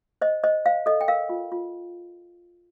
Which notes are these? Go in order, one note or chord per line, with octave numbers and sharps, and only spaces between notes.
C5 D#5
C5 D#5
C5 F5
A4 D#5
G5
A#4 F5
F4
F4